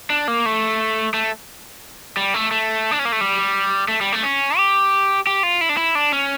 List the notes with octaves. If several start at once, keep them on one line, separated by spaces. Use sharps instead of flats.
D4
A#3
A3
A3
G3
A3
A3
D4
C#4
A#3
A3
G3
A3
G3
A3
C#4
G4
G4
F4
E4
D4
E4
D4
C#4